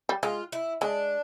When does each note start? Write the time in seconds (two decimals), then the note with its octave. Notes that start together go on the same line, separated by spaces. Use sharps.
0.09 G3
0.23 G#3 F4
0.52 E4
0.81 G#3 D4